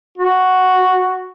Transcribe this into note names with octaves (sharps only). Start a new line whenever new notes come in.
F#4